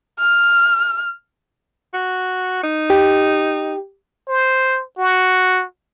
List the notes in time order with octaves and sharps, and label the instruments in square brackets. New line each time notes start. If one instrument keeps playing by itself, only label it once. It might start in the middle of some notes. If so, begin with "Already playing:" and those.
[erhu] F6
[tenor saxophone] F#4
D#4
[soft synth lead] G4
[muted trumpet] C5
F#4